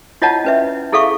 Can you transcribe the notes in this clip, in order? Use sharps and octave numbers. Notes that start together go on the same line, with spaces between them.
E4 F4 C#5 D#5 F#5 A5
C#4 B4 E5
E4 G#4 A4 E5 F5 C#6